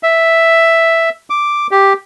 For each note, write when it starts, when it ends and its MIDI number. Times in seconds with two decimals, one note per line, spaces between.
0.03 1.09 76
1.30 1.67 86
1.71 1.93 67